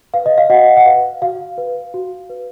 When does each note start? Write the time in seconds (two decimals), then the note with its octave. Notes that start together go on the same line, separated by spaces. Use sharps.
0.14 B4 F5
0.26 D#5
0.38 F5
0.50 F#4 D#5 F#5
0.77 F#5
0.86 B4 F5
1.22 F#4 F5
1.58 B4
1.94 F#4
2.30 B4